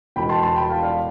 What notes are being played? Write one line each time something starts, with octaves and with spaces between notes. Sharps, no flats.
E1 E2 B2 G5 B5
A5 C6
A5 C6
G5 B5
F5 A5
D5 F5